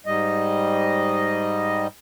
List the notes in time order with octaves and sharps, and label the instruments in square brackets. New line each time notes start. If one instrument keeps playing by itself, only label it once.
[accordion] G#2 G3 D#5